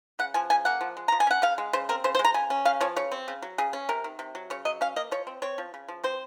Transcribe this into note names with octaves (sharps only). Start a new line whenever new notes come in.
C#3 F#5
F3 G#5
C#3 G#5
A#3 F#5
F3
G#3
F3 A#5
G#5
C#4 F#5
C#3 F5
G#3
C#3 C5
C4 A#4
C#3 C5
C5
G#3
A#5
C#3 G#5
C#4
C#3 F5
F3 C#5
C#3 C#5
C4
C#3
F#3
C#3 G#4
C#4
C3 A#4
D#3
C3
F#3
C#3 C#5
F#3 D#5
C#4 F5
A#3 D#5
F3 C#5
C4
C4 C#5
F3
C#3
F3
C4 C5